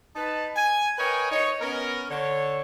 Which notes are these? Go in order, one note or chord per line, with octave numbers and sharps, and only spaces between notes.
D#4 B4 A5
G#5
A#4 B4 C#5 D#5 G5 G#5
D#4 C#5
B3 C#4 A#4
D3 C#5